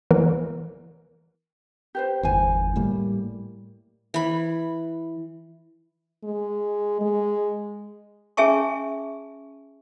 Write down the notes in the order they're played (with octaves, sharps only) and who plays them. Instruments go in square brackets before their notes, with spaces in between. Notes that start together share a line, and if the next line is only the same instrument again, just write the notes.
[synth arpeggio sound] E3 B3 A#4
[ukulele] G4 B4 C5
[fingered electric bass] G1 E2 [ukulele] C5 G#5
[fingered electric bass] A2 G3 A#3
[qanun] E3 B5
[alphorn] G#3
G#3
[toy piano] C#4 G#4 E5 G#5 A5 C#6